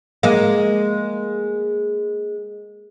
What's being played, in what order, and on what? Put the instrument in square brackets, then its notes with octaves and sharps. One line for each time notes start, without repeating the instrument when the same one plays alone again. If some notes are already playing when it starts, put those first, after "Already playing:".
[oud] G#3 A#3